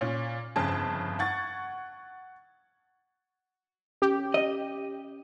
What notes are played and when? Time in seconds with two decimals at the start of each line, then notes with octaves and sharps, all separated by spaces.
0.01 A#2 C#4
0.56 G1 F2 C#3 G#4 A5 G#6
1.19 F#5 C#6 G#6 A6
4.02 C#4 G4
4.34 D#5